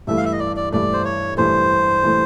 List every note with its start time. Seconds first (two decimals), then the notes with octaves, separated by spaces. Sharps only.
0.07 G2 E3 A3 E5
0.17 F5
0.25 E5
0.32 D#5
0.39 D5
0.56 D5
0.72 G2 E3 A3 D5
0.93 C5
1.05 C#5
1.37 G2 E3 A3 C5
2.03 E3 A3